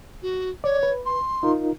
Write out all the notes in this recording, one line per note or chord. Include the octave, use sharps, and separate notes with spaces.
F#4
C#5 D5
B4
C6
D#4 F4 A#4